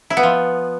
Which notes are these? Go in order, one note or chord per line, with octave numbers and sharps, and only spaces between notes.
E4
B3
F3